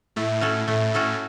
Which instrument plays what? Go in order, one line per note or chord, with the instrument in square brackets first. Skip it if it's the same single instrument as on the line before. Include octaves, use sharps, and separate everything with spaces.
[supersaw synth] A2 [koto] A3
[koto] C#4 F#4 A4
[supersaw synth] A2 [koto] A3
[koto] C#4 F#4 A4